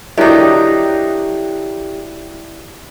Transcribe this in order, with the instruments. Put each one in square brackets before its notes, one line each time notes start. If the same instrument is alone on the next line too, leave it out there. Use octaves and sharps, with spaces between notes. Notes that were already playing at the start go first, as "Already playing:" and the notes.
[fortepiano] D3 F#3 [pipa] D#3 D#4 [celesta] E4 D5 E5 [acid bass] G4